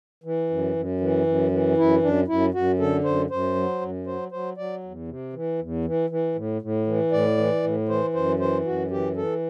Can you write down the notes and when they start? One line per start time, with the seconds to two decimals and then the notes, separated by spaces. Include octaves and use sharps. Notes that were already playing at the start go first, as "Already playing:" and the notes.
0.24 E3
0.50 F#2
0.76 F#2
1.00 E3
1.26 F#2
1.51 E3
1.78 F#2 E4
2.02 F#2 D4
2.28 F#2 E4
2.54 F#2 F#4
2.79 D3 A4
3.04 F#2 C5
3.30 F#2 C5
3.55 F#3
3.81 F#2
4.07 F#3 C5
4.32 F#3 C5
4.57 F#3 D5
4.83 E2
5.08 C3
5.33 E3
5.59 E2
5.85 E3
6.10 E3
6.35 A2
6.62 A2
6.87 E3
7.12 A2 D5
7.37 E3
7.63 A2
7.89 E3 C5
8.14 F#2 C5
8.39 E3 C5
8.65 F#2 F#4
8.90 E3 G4
9.16 E3 A4